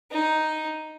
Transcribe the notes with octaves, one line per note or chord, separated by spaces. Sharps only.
D#4